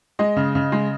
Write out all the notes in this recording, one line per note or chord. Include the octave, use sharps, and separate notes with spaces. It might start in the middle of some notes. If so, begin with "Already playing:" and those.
G#3 D#5
C#3
C#3
G#3